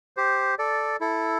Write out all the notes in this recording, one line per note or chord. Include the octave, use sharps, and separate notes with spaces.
G4 C5
A4 D5
E4 A4